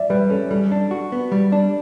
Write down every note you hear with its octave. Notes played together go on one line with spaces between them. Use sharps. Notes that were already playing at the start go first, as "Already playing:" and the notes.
Already playing: D5 E5
G3 B4
C#4 A4
G3 A4
D4
F#4
B3
G3
D4